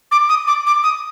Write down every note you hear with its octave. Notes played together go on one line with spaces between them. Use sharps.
D6
D#6
D6
D6
D#6